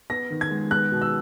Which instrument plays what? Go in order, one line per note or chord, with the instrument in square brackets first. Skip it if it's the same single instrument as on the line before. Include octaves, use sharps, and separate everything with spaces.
[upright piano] B3 A#6
D#3
G#6
G#3
B3 F#6
B2
E6